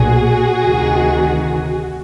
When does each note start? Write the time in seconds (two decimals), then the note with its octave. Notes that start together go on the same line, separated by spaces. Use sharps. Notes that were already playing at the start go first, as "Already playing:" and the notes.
Already playing: B1 A#2 F#4 G#4
0.63 D2 C3 D#3